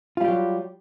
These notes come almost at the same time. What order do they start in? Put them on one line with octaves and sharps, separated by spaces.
F4 G3 G4 F#3